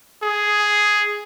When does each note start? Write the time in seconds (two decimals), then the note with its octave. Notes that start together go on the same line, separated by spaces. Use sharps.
0.23 G#4